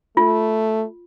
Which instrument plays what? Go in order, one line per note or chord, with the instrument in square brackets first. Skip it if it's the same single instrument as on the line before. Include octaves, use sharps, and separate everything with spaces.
[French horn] A3 [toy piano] F4